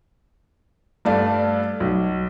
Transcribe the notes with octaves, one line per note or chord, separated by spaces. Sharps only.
G2 A3 D5 F5
B1